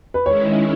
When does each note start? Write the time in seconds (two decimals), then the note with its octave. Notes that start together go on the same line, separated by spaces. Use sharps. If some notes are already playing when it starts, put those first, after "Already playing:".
0.14 B4
0.26 D#3 G#3 C#4 E4 C#5